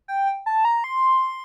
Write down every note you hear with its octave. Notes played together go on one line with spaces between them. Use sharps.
G5
A5
A#5
C6